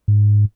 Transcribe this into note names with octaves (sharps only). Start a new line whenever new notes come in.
G#2